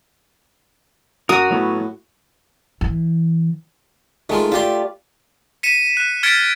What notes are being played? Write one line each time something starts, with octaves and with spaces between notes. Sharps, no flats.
F#2 F#4 A#4 D#6
A2 F#3 B3 C#4
E3
D#3 G#3 A3 F4
F4 G4 D5 E5 C6
B6 C#7 D#7 E7
F#6 E7
F6 G#6 A6 B6 C#7 D7